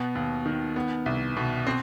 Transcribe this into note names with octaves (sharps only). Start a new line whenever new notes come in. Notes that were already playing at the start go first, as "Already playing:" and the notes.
Already playing: B2 B3
D#2
D#3
B3
C2
B2
C4